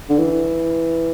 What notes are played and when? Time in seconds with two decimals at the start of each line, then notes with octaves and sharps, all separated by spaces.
0.09 D3
0.19 E3